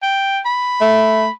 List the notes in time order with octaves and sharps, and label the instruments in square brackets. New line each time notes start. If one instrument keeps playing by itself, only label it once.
[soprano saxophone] G5
B5
[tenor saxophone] A3